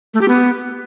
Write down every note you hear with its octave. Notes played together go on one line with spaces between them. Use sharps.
A3
G4
B3